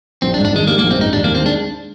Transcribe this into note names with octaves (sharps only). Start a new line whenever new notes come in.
A#1 C4
D4
G#2
D4
D#3 G#3
G3 A#3
A#3
A#1
C4
G#2 D#4
D#2 D4
A#3
D#3
C4
G#3 D4